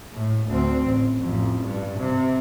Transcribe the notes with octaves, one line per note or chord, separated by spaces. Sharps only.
A2
D2 C4
A1
A1 F2
G2
C3